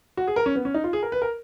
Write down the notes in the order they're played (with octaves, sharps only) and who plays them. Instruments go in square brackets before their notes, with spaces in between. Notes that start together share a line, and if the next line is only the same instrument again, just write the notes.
[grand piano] F#4
G#4
A#4
C#4
B3
C#4
D#4
F4
G#4
A#4
B4
A#4